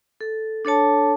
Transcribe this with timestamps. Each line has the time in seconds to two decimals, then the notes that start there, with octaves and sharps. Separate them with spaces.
0.21 A4
0.65 D4 A4 C#5 A5